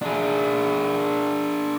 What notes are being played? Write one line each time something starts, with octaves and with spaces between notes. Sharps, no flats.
D4 G#4